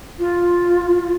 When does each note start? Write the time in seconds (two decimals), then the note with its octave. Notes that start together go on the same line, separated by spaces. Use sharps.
0.19 F4